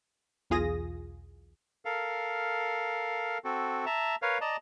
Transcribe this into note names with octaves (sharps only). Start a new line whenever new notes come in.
B1 E2 F4 G#4 D#6 A#6
A4 A#4 F5
C4 F#4 A4
E5 A5 A#5
A#4 B4 C#5 F5
D5 D#5 A5 A#5